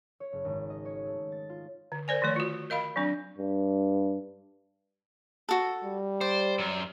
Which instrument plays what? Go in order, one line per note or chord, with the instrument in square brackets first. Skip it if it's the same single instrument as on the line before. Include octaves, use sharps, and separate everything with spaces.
[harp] C#5
F#1
G#1
D#5
C#5
A3
A6
F4
[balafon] D3
A#4 C5 D5 G#5
D#3 F3 A3 C#5 D5
F4 F#4
A#4 D#5 F5 B5
F#3 C4 D4
[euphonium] G2
[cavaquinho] F#4 A4
[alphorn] G3
[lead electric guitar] C5 [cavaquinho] D5
[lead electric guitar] F#2